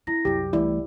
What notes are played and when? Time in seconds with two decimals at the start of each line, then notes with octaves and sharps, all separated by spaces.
0.07 C4 E4 A#6
0.25 C2 F#2 G4
0.53 C2 E3 G#3 A3 E4 D5